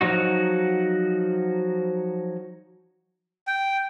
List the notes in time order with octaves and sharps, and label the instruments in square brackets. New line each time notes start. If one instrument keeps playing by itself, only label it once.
[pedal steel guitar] F3 F#3 D#4 F#4
[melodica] G5